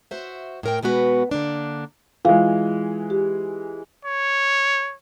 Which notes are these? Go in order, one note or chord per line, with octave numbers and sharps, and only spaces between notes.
F#4 C5 E5
A2 A#4 G5
B2 G#3 B3 F#4 B4
D3 A#3 D4
E3 G#3 F4 G#4 F5
G4
C#5